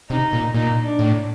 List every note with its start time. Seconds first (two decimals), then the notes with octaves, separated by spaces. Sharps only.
0.10 C3 D#4
0.33 A#2
0.54 A#2 D#4
0.84 D4
0.99 A2